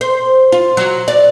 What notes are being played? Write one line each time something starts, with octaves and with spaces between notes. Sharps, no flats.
C5
F4
F#3
D5